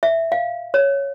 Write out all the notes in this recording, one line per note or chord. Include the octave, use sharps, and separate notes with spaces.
E5
F5
C#5